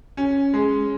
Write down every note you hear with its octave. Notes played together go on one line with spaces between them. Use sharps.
C#4
G#3